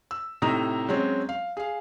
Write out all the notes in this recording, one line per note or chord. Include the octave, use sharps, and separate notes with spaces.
E6
A2 C3 D#4 A#5 D#6
F#3 G#3 C4 C#4
F5
G#4 F5